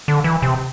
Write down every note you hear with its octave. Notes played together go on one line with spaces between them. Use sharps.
D3
E3
C3